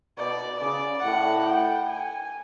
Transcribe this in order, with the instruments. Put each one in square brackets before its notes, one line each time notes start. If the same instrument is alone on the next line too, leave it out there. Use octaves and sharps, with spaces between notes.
[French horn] B2 [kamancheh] D5
[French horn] C#3 [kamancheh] D5
[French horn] A2 [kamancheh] F#5
[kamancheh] G5
G#5